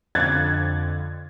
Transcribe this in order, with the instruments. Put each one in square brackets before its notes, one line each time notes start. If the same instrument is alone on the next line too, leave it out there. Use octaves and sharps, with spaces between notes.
[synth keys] F2 D3 [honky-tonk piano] F#6 G#6 A6